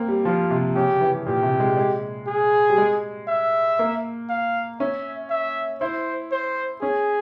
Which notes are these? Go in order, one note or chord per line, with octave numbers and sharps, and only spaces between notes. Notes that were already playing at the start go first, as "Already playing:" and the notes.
Already playing: A#3 C4
G3
F3 F4
C3
C#3 G4
E3
A#2 G4
C3
G#3
G#3
G#4
G3
G#3
E5
A#3
F5
C#4 E5
E5
E4 C5
C5
C#4 G#4